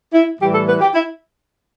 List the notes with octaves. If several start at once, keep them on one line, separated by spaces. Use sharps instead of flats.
E4
A2 E3 G3 G4
A4
B4
G4
E4